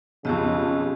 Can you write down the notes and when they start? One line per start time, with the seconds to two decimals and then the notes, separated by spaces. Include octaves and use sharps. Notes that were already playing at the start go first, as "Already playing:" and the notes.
0.25 B1 F2 C#3 C#4 G4 D#5